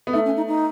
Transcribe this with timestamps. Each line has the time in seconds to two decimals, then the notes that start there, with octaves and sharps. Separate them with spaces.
0.07 B3
0.13 A3 D#4
0.25 C#4
0.37 D#4
0.48 D#4